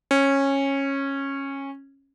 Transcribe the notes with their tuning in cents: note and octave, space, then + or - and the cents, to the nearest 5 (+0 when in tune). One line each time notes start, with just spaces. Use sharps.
C#4 -15